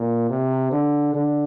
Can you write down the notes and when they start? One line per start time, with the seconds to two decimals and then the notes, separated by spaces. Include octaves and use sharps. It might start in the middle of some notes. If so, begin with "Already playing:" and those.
Already playing: A#2
0.29 C3
0.72 D3
1.14 D3